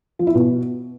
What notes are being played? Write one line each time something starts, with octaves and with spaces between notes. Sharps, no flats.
F3
E4
B2